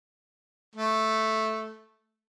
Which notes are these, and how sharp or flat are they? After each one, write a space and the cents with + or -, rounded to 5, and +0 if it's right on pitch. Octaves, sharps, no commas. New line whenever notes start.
A3 -5